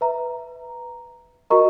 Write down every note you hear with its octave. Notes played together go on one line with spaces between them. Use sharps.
B4 E5 A#5
F#4 A#4 D#5 A#5 C#6